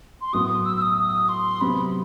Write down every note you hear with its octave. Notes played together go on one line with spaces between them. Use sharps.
C6
A2 F#3 B3 F#4 D#6
D#6
E6
E6
D#6
D#6
C6
C3 F#3 B3 B5